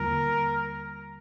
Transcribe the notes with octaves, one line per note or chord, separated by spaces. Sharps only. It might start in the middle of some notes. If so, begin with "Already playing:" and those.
Already playing: D#2 D3 G3 A#3 F4 A#4